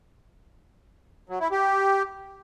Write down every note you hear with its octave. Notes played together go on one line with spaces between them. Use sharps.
F#3
E4
G4